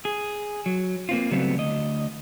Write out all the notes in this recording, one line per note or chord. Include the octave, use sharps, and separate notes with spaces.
G#4
F#3
A#3 C4 F4
C#3 F#3 G3 A3 B3 C4
D2 D#5